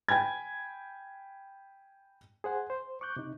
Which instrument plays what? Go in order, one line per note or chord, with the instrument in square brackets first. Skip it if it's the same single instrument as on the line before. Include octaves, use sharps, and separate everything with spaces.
[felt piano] G5 G#5 B5 G#6
[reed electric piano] G#4 C5 F#5 G#5
C5
C#6 D6 F#6 G6
C3 D#4